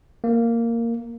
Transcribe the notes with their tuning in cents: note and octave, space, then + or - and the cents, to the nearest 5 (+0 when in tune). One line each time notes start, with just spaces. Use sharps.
A#3 -10